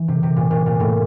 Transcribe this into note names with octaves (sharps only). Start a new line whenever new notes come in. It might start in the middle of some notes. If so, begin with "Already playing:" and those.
Already playing: E3
C3
C3
A#2
A#2
A#2
A2